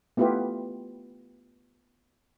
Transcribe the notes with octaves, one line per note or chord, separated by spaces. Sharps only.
A3 B3 E4 F4 G4 B4